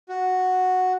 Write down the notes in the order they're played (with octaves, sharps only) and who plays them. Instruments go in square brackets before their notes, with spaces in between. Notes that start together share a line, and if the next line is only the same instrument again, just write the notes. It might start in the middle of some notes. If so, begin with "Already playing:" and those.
[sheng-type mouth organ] F#4